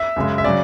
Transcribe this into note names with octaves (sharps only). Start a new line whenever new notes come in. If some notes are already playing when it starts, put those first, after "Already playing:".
Already playing: E5
F#2 C#3 G#3
E5
C#3 F#3 D5